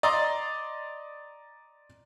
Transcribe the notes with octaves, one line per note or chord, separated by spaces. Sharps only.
D5 D#5 A#5 C6 D6 D#6